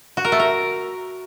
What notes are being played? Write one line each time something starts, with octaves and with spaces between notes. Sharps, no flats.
F#4
A#4
A3
A#4